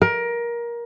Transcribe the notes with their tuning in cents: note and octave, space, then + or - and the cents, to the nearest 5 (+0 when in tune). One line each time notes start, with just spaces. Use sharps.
A#4 +20